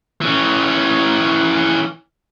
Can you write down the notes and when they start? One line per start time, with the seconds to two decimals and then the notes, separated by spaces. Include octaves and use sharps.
0.21 E3 C#4